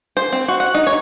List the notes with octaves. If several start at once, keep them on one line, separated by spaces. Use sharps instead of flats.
C5
C4
F#4
F#5
D#4
C#5